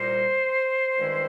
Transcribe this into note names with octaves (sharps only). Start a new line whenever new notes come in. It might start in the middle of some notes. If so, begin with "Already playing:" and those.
Already playing: C2 A#2 G3 A#3 D#4 C5
G2 D#3 G#3 C#4 E4